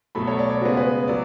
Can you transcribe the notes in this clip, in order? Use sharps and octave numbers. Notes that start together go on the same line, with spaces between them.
B2 F#3 A3 B5
C#5
D5
C#5
C#3 G#3 B3 F#4
B4
F#3 D5